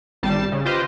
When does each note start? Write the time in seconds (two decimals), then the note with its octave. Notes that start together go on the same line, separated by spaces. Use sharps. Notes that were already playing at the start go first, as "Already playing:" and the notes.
0.23 G#1 G3 A5 A6 C7
0.52 C#3
0.65 F4 G4 B4 C5 D#5